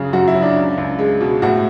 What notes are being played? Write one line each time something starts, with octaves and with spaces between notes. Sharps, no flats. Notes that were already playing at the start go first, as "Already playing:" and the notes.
Already playing: F#2 C#3 F#3 G#4
F#2 F#4
E4
F#3
D4
C#2
C#2
G#3
B2
A2 F#4